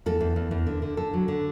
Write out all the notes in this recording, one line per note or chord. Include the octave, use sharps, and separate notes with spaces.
E2 A4
E2
E2
E2
D3
D3
D3 A4
F#3
D3